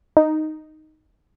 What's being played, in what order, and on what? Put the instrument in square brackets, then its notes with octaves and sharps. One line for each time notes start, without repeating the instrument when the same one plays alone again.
[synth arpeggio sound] D#4